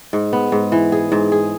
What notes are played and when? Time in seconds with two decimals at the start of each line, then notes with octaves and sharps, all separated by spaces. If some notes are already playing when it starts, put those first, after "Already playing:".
0.13 G#2
0.33 B3
0.52 G#2
0.72 E3
0.92 G#4
1.12 G#2
1.32 G#4